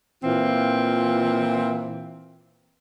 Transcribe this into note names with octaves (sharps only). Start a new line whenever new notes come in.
A#2 E3 C4 F4